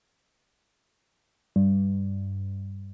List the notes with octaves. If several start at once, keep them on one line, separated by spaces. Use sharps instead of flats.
G2